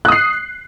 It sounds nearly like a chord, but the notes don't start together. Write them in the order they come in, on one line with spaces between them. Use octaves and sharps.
F#6 D#6 C7